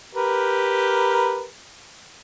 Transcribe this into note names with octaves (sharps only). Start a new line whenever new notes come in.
G4 A#4 B4